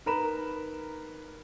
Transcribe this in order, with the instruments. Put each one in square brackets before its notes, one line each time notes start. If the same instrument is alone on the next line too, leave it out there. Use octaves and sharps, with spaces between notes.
[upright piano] D#4 A#4 B4 B5 E7